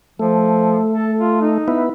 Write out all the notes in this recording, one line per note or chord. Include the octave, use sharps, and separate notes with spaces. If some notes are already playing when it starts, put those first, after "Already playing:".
F3 A3
A4
F4
D#4
B3 E4